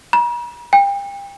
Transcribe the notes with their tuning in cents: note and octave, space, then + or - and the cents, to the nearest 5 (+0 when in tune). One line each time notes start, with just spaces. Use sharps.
A#5 +45
G5 +30